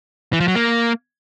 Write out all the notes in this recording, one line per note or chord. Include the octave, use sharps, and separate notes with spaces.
E3
F3
F#3
A#3